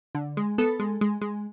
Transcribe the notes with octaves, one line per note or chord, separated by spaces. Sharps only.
D3
G#3
B3 A4
G#3
G#3
G#3